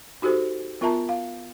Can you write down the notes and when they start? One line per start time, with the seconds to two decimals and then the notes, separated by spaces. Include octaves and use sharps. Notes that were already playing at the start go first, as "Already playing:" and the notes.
0.22 D#4 F#4 G4 A4 C5
0.81 B3 F4 A#4 E5 A5 A#5
1.09 F5